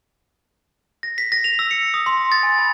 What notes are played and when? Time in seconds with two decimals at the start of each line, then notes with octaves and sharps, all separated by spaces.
1.03 A#6
1.18 B6
1.32 A#6
1.44 F7
1.59 E6
1.71 C#7
1.94 D#6
2.06 C6
2.18 D#6
2.32 A6
2.43 G#5
2.58 B5